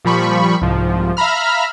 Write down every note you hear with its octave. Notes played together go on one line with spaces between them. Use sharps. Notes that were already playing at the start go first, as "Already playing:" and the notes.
A#2 F3 G3 B5 C#6
C2 G#2 F3
E5 F5 A#5 B5 F6